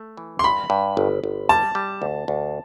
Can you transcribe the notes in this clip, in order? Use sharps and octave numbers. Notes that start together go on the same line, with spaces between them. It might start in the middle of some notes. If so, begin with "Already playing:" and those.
Already playing: A3
E3
C6
G2 B5
G2
G1
G1
G3 A5
G3
D2
D2